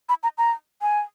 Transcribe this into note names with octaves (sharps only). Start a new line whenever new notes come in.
B5
A#5
A#5
G#5